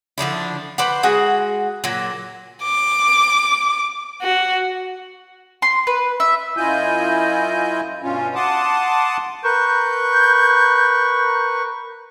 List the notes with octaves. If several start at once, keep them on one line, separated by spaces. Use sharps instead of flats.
D3 F3 D4 E4
B4 C5 D5 F#5
G#3 F#4 F#5 G#5
A#2 F#3
D6
F#4
C6
B4
E5
F#2 E4 F4 D#5 G#5 G6
G2 B2 C#4 F4
F#5 A5 C6 D6 D#6
A#4 B4 C#6 G6